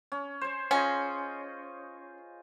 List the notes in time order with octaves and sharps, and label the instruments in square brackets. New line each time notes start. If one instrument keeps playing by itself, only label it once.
[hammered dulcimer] C#4
C5 C#5
[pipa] C#4 [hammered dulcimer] F4 G#4 D#5